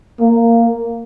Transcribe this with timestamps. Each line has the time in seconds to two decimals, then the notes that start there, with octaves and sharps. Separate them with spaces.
0.20 A#3